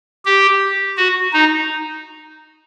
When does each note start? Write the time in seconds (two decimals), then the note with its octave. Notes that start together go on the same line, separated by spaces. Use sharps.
0.25 G4
0.97 F#4
1.33 D#4